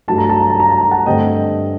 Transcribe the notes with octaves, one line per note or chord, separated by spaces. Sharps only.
G2 F#3 A3 A5
A#5
A5
A#5
A5
A#5
A5
A#5
F#5 A5
G2 D3 A3 C4 D#5 G5